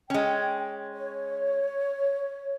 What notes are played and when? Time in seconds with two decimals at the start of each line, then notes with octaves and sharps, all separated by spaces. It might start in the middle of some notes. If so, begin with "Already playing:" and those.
0.10 G#3 C#4 G5
0.94 C#5